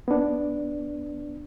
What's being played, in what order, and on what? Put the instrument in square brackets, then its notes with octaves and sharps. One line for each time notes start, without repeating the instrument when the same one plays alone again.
[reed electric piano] B3 D4